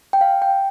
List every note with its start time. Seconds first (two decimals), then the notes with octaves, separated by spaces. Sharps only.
0.13 G5
0.21 F5
0.42 G5